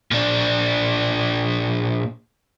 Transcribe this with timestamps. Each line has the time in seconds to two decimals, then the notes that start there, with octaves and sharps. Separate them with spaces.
0.11 A#2 D4